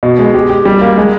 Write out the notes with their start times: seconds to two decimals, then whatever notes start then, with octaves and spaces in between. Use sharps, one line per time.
0.03 B2
0.19 G#3
0.34 G4
0.50 G4
0.65 G3
0.81 A#3
0.97 G#3